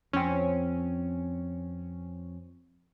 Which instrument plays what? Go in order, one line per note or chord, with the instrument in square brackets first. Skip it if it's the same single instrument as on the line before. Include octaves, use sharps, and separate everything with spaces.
[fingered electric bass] F2 [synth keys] C4 C#4